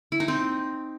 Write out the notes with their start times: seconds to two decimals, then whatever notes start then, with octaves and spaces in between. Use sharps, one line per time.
0.12 E4
0.20 D#4
0.28 C4